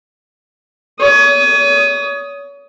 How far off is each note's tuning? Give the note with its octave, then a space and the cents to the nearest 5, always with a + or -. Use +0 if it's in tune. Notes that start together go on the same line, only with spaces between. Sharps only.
C#5 +35 D#6 +5